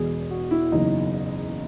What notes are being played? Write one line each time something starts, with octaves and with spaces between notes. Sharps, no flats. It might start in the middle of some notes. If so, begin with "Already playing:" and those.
Already playing: E1 E2 B2 G#4
F#4
E4
F#1 E2 C#3 F#3 D#4